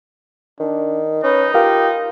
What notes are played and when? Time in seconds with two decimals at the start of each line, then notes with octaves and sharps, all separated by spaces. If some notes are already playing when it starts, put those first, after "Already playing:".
0.60 D#3 D4
1.24 C#4 D#4 B4
1.54 F4 G4 A#4 F5